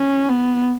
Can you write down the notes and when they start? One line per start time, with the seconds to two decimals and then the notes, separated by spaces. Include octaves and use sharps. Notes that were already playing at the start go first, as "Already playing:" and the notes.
Already playing: C#4
0.29 B3